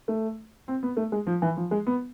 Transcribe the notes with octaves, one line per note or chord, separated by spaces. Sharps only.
A3
C4
B3
A3
G#3
F3
E3
F3
G#3
B3